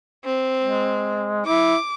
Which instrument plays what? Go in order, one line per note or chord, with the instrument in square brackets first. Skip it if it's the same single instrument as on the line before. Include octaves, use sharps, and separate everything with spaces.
[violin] C4
[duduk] G#3
[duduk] E4 [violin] D6